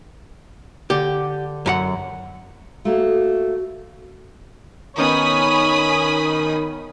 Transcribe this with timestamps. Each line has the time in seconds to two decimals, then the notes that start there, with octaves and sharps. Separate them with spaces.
0.90 D3 G4
1.66 F#2 G4 F#5
2.85 A3 A#3 F#4
4.98 D#3 B3 C#4 D#4 C#5 G#5 B5 D#6